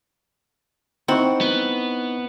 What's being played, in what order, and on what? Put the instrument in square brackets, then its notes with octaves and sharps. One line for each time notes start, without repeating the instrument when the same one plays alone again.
[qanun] C4 F#5 [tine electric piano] D#4 E4 C#6
[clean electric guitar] B3